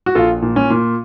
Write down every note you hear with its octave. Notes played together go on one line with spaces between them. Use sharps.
F#4
A#1 F4 A4
A#2
C#4
A#2